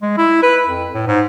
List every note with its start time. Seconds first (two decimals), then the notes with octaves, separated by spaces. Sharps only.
0.02 G#3
0.18 E4
0.43 B4
0.65 F2
0.94 A2
1.08 G#2